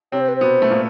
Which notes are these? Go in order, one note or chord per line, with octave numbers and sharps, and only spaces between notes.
C3 C4 C#5
C5
B4
C5
B2 B3
A3
A#2 A#3